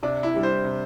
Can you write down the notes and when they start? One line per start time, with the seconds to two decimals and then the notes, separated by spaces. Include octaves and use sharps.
0.03 C3 D4
0.23 E4
0.34 G3 D4 G4
0.43 C5
0.64 C3